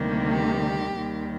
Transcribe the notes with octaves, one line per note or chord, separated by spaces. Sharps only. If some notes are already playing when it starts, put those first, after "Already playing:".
Already playing: D2 C3 D#3 G3 A#3
G4
D#2 D#3 G3